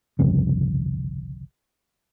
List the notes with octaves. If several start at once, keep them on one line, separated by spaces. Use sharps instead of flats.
G1 C2 F2 C#3